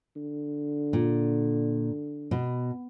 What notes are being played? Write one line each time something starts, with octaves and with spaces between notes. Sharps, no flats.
D3
A#2
B2